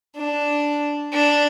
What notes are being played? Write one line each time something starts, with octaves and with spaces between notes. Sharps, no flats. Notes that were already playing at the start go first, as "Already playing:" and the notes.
D4
D4